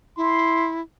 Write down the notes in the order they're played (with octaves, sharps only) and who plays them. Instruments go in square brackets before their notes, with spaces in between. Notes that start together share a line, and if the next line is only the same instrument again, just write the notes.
[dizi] E4 [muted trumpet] C6